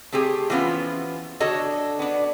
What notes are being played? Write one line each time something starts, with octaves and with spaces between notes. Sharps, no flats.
A3 C4 G4 G#4
E3 F3 B3 C#4 F4
D3 F#4 A4 C#5 D#5
B3 D4